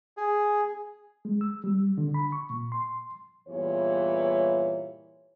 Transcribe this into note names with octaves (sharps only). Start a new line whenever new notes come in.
G#4
G#3
E6
G3
D3
B5
C#6
A#2
C6
E2 G2 A#2 E3 C#5